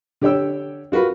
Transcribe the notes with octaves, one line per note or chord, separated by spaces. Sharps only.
D3 G4 C#5 G5 E6
F4 F#4 A#4 B4